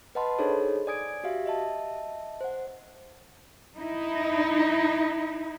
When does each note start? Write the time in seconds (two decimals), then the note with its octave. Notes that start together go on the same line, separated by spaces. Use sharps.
0.15 B4 D#5 F#5 A5 B5 C6
0.38 D4 D#4 G#4 A4 C5 C#5
0.87 D5 G#5 D#6 G#6 D7
1.24 F#4 G4 E5 F5
1.46 D#5 E5 A5
2.41 C5 F#5
3.77 D#4 E4